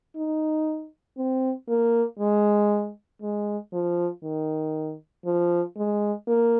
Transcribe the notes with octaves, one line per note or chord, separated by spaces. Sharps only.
D#4
C4
A#3
G#3
G#3
F3
D#3
F3
G#3
A#3